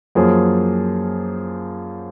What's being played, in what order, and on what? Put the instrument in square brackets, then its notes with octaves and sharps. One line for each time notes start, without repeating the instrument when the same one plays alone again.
[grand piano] F#2 F3 A#3 C#4 G#4